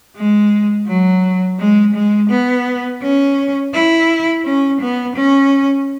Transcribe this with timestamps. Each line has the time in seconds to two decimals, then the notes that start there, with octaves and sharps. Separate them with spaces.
0.16 G#3
0.87 F#3
1.59 G#3
1.94 G#3
2.30 B3
3.02 C#4
3.74 E4
4.45 C#4
4.81 B3
5.16 C#4